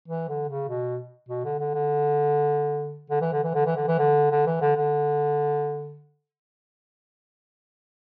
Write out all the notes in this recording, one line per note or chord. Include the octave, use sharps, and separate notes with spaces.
E3
D3
C#3
B2
B2
D3
D3
D3
D3
E3
D3
E3
D3
E3
D3
E3
D3
D3
E3
D3
D3